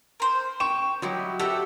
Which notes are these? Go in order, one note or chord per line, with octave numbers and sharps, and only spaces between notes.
A#4 C5
G5 C#6 E7
F#3 D#4 E4 G4
F#4 G4 A4 E5 F#5